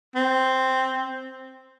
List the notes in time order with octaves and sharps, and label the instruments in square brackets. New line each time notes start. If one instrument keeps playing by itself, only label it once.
[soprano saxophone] C4